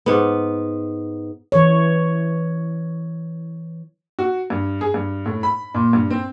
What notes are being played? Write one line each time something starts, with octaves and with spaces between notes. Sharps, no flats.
G#2 B3
E3 C#5
F#4
G2
G#4
G2
A2
B5
A#2
G2
C4